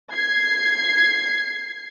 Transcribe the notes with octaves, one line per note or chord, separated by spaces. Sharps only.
G#6 C7